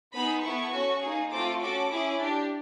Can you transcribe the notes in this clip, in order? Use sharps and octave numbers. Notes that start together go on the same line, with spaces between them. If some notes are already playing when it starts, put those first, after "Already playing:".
B3 D#4 G#4 B5
B3 E4 A4 C#6
C#4 F#4 A4
A#3 D#4 G#4
A3 C4 F4 A4 D6
C#4 F#4 A4 D6
C#4 E4 G#4
D4 G4